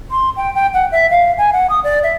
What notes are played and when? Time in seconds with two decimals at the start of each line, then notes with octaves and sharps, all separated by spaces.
0.11 C6
0.37 G5
0.55 G5
0.74 F#5
0.92 E5
1.11 F5
1.38 G#5
1.53 F#5
1.70 D#6
1.84 D5
2.03 E5